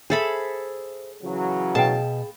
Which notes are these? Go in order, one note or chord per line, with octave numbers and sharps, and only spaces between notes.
G#4 A4 C5 E5 B5
C#3 E3 F#3
B2 G#4 F5 G5 A5